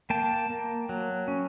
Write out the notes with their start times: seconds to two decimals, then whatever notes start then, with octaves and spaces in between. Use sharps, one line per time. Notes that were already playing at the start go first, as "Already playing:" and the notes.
0.10 A#3 G5 A5
0.50 A#3
0.89 F#3
1.28 C#4